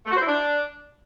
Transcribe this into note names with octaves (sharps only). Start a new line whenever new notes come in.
A3
F#4
C5
E4
D4